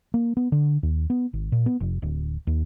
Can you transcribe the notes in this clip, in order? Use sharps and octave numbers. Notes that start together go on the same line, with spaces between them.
A#3
B3
D3
D#2
B3
G#1
A#2
B3
F1
D1
D#2